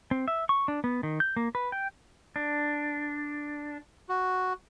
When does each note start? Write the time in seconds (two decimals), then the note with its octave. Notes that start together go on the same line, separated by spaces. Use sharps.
0.11 C4
0.28 E5
0.49 C#6
0.68 D4
0.84 B3
1.03 D#3
1.20 G6
1.37 A#3
1.55 B4
1.72 G5
2.36 D4
4.09 F#4